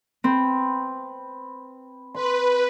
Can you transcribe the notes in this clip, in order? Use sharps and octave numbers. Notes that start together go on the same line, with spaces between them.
C4 B4
B4 C6